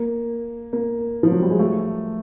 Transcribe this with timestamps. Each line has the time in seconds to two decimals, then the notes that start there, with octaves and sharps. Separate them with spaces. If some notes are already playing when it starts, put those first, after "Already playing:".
Already playing: A#3
0.73 A#3
1.23 F3
1.32 F#3
1.42 G3
1.50 G#3
1.59 A3